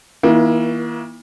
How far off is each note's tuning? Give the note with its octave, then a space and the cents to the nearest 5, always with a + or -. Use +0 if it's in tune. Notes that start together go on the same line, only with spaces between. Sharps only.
E3 -40 A#3 +35 E4 +45